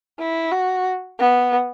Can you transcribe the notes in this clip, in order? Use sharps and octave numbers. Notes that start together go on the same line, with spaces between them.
E4
F#4
B3